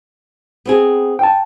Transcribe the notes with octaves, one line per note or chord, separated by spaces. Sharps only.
B3 C4 G#4
G5 A5